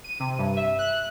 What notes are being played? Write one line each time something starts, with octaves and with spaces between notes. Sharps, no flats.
D#7
C3
G2
E5
F#6